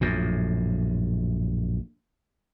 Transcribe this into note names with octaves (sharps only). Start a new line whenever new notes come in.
A#1 F#2 A2